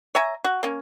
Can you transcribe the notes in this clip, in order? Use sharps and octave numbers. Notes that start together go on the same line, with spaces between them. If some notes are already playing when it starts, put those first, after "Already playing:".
C#5 E5 G#5 A#5
F#4
A#3 C#4